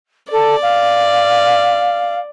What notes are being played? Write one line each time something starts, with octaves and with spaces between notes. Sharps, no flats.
A4 D5
F5